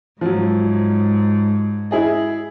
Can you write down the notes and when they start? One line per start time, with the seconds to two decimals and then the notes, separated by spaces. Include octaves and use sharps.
0.21 G#2 F3 F#3
1.91 E4 G#4 D#5